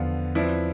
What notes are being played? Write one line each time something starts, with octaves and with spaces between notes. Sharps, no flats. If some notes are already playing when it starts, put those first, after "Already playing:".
Already playing: E2 D3 F3 B3 F4
F3 C4 E4 B4 D5